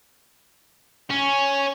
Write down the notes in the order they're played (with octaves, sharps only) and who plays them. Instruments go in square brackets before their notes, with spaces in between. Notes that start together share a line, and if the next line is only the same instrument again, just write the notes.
[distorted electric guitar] C#4 [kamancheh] G#5 C#6